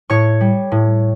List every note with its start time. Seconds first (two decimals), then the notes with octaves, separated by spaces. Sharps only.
0.10 A2 C#5 C#6
0.41 G3
0.72 A2